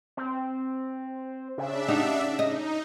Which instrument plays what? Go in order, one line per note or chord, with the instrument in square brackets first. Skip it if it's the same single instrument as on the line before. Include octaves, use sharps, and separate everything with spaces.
[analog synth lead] C4
[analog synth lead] C#3 [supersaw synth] D4 E5
[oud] D#4 F#4 G4
[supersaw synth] D#4 [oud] D#5